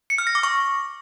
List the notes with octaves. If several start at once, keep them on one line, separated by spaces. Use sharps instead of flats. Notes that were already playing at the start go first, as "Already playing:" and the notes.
C#7
F6
A#6
D6
C#6